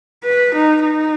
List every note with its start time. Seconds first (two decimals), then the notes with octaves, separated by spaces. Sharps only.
0.24 B4
0.55 D#4
0.84 D#4